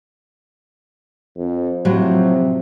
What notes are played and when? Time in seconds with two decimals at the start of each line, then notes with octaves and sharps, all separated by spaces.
1.36 F2
1.85 A2 C3 F3 F#3